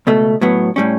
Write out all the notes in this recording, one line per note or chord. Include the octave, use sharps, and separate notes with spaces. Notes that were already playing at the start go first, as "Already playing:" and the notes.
C#2 B2 A3
A2 F#3 B3
A2 G3 C#4